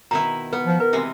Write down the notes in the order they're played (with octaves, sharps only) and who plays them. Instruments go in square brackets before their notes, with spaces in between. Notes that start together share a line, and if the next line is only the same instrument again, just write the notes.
[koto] B2 D#3 E4 [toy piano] A#5
[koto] B3 [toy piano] B4
[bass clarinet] F3
[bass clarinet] A#4 [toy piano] B4
[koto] C3 E3 G#3